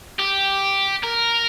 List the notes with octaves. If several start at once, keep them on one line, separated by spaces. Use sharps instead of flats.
G4
A#4